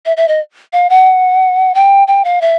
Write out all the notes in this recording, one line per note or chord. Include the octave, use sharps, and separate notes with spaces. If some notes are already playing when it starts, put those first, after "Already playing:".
E5
E5
D#5
F5
F#5
G5
G5
F5
E5